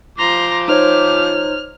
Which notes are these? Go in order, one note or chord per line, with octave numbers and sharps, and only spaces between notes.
F3 A#5 C6 D6
D#4 C5 C#5 F6